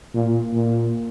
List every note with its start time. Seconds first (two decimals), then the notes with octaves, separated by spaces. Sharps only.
0.14 A#2
0.54 A#2